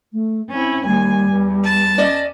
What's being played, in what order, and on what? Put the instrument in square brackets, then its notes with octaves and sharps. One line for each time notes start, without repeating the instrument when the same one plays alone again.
[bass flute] A3
[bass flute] C4 [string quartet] C#4 E4
[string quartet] D#2 G#5 [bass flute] G3
[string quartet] E2
[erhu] A5
[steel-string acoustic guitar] C#4 D5 D#5